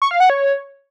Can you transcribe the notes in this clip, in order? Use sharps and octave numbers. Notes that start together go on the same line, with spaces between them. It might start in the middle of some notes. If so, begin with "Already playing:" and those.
C#6
F5
F#5
C#5